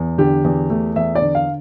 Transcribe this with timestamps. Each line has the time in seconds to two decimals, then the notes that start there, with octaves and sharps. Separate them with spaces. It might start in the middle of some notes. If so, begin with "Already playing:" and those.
Already playing: E2
0.18 D3 G4
0.44 E2
0.70 A3
0.96 E2 E5
1.15 D5
1.22 D3
1.35 F5